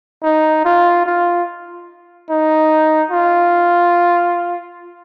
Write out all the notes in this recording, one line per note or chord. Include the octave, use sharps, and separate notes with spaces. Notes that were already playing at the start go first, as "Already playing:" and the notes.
D#4
F4
F4
D#4
F4